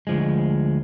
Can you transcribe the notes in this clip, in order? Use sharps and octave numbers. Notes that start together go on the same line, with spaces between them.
D2 F3 G#3